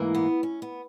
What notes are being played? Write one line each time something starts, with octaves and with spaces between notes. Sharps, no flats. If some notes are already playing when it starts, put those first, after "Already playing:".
Already playing: G#2 E3 A#3
B3
C#4
B3